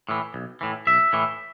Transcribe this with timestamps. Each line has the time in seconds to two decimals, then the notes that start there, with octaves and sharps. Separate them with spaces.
0.09 A2 E3
0.34 B1
0.61 A2 E3
0.87 B1 E5
1.13 A2 E3